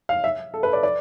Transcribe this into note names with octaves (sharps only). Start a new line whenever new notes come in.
F5
E5
A4
B4
D5
D5